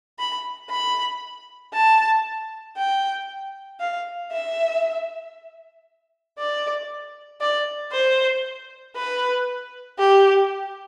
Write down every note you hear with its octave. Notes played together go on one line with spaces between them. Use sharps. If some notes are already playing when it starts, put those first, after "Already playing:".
B5
B5
A5
G5
F5
E5
D5
D5
C5
B4
G4